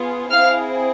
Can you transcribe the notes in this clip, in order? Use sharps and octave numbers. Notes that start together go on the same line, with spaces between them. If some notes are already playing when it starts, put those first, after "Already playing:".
Already playing: B3 F4 G#4
C4 E4 G#4 F5 F6